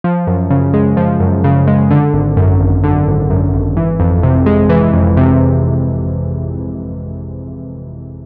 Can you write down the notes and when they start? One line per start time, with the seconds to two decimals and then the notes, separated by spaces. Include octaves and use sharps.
0.04 F3
0.27 F#2
0.50 C#3
0.73 G#3
0.97 F3
1.20 F#2
1.44 C#3
1.67 G#3
1.91 D3
2.13 G#1
2.37 F#2
2.60 G#1
2.84 D3
3.07 G#1
3.30 F#2
3.53 G#1
3.77 E3
4.00 F2
4.23 C3
4.46 G#3
4.69 E3
4.93 F2
5.17 C3